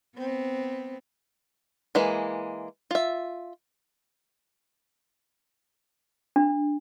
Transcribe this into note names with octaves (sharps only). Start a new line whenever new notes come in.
B3 C4
E3 G#3 A#3
F4 E5
D4